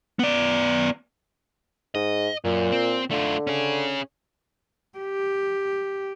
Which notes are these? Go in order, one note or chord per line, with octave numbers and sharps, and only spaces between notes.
B3 D5
G#2 D#5
F#2 A#2
C4
D3 A3 F4
C#4 G#4
G4